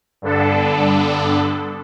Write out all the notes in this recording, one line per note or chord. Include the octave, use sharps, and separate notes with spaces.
G2 D3 B3 D4 A4